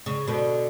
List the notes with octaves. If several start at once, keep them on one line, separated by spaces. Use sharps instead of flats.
C#3
B2 D3